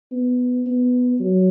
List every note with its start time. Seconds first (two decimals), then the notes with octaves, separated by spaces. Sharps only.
0.12 B3
0.67 B3
1.21 F#3